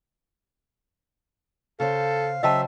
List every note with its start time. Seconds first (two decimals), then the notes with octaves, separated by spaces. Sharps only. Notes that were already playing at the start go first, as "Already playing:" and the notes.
1.80 C#3 A4 C5 F5
2.43 C#3 F#3 C5 D#5 E5 G5 A5